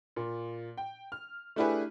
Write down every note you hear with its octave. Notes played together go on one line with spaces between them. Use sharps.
A#2
G5
F6
A3 D4 E4 G4 G#4 B4